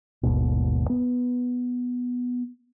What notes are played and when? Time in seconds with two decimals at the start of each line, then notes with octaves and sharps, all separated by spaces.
0.23 G#1 D#2 G#2 B2
0.90 B3